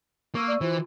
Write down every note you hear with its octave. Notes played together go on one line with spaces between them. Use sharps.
A#3 C#6 E6 D#7
D5
E3 F4 F#4 C5